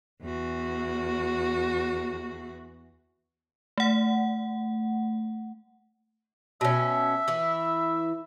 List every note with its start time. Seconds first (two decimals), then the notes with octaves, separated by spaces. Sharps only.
0.22 E2 F#4
3.78 A3 F#5
6.61 B2 C#4 E5
7.28 E3 E4